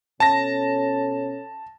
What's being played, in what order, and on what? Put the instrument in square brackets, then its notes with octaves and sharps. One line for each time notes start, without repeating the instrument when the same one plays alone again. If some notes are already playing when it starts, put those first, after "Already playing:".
[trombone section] B2 C#4 A4 [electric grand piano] A5 A#6